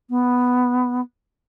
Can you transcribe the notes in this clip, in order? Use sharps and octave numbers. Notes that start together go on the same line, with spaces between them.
B3